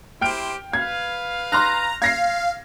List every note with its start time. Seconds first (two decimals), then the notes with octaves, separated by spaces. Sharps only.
0.21 E4 G4 C5 G5 F6 D7
0.73 B4 F5 G#6
1.52 A#5 C6 F6 F#6
2.02 F5 G#6 A#6 C7